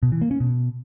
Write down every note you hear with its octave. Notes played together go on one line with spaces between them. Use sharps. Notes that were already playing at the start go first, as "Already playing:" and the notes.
B2
E3
A#3
C#4
B2